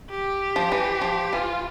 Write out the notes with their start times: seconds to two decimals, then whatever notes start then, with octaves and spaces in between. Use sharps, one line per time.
0.10 G4
0.56 F3
0.72 E3
1.01 F3
1.33 E3 F4